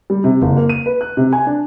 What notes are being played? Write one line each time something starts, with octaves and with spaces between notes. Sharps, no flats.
G3
C3
F#1
A#3
D#7
B4
F#6
C3
G#5
D4